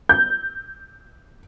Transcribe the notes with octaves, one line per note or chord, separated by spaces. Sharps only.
G6